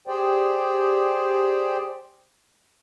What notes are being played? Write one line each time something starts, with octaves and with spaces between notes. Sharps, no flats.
G4 G#4 C5 D5 G5